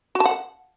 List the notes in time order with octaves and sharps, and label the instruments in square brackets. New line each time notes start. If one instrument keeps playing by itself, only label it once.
[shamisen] F#4
A5
F#5